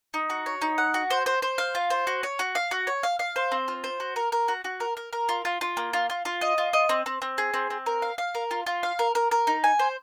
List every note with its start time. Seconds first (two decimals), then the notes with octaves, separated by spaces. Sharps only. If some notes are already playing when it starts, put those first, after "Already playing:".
0.14 D#4
0.30 F#4
0.46 C#5
0.62 D#4
0.78 F#5
0.94 F#4
1.10 C5
1.26 C5
1.42 C5
1.58 F5
1.75 F4
1.90 C5
2.07 F#4
2.23 C#5
2.39 F#4
2.55 F5
2.71 F#4
2.87 C#5
3.03 F5
3.19 F5
3.36 C5
3.52 C4
3.68 F4
3.84 C5
4.00 F#4
4.16 A#4
4.32 A#4
4.48 F#4
4.64 F#4
4.80 A#4
4.97 A#4
5.13 A#4
5.29 F4
5.45 F4
5.61 F4
5.77 A#3
5.93 F4
6.10 F4
6.25 F4
6.41 D#5
6.58 F4
6.73 D#5
6.89 C4
7.06 C4
7.22 C4
7.38 G#4
7.54 C4
7.70 C4
7.86 A#4
8.02 F5
8.18 F5
8.35 A#4
8.51 F4
8.66 F4
8.83 F5
8.99 A#4
9.15 A#4
9.31 A#4
9.47 D#4
9.64 G#5
9.79 C5